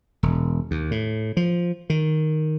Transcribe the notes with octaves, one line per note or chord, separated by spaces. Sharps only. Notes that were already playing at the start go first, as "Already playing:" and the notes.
E1
D#2
A2
F3
D#3